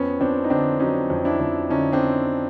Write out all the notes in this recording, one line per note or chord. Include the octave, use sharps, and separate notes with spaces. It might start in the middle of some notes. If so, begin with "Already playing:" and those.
Already playing: F2 B3 C#4
F2 C4 D4
D#4
D3 C4 D4
F#3 C#4 D#4
F2
D4 E4
F2
D3 C#4 D#4
C4 D4